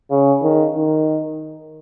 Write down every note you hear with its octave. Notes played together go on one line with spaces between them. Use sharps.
C#3
D#3
D#3